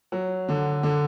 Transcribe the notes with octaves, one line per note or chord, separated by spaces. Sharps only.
F#3
D3
D3